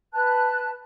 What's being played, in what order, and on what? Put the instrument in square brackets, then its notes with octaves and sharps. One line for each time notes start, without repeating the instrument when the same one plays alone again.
[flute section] B4 A5 F#6